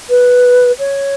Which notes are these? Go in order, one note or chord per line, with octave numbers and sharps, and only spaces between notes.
B4
C#5